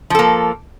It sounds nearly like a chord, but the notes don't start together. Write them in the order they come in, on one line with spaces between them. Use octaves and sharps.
F3 A4 A#3